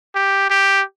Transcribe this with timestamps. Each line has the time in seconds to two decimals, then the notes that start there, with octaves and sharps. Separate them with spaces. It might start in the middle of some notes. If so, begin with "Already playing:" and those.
0.16 G4
0.50 G4